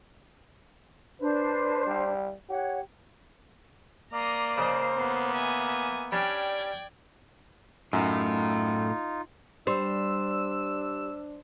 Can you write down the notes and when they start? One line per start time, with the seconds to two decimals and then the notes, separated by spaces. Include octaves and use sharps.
1.21 D4 B4 C5
1.87 G3
2.50 G4 C#5 F#5
4.13 A#3 D5 A#5 C6 D#6
4.58 C#3 C5 D#5
4.97 B3
5.33 E5 G#5 D#6
6.12 G3 C#4 D4 D5 G5 G#6
7.93 F#2 A2 D#4 F4
9.67 G3 D4 C5 E6